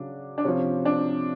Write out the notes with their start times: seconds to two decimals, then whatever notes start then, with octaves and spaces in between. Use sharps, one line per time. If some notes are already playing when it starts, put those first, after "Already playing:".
Already playing: C#3 F#3 D4
0.38 D4
0.44 C3 F3 C#4
0.85 D4